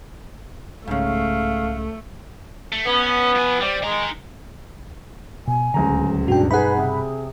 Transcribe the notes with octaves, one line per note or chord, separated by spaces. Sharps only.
C2 G#2 C#3 A3 F5
A3
B3 C#4
F3 G#5
G3 C4 G4 D5
D#3 G#3 A#5
B2 G#5
D1 C#2 D3 F#3 A3 A#5
G2 B2 G3 D4 F#4 G5
D#4 G#4 B4 F#5 B5
C3 G#4